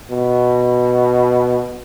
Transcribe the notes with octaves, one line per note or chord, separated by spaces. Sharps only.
B2